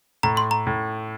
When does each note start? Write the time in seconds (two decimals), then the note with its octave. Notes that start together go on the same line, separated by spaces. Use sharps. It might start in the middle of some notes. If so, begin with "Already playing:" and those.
0.23 A2 A#5
0.37 C6
0.51 A#5
0.67 A2